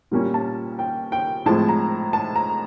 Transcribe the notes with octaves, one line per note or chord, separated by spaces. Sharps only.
A#2 G3 A#3 C#4
A5
G5
G5
A2 F3 G#3 C4 A5
A#5
A5
A#5